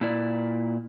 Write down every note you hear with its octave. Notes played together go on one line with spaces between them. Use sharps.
A#2 E4 D5